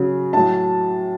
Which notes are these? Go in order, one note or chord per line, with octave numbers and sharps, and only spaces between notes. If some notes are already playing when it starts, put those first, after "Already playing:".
Already playing: C#3 F#3
A2 F#3 A5